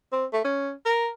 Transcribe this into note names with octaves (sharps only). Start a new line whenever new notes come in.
C4
A3
C#4
A#4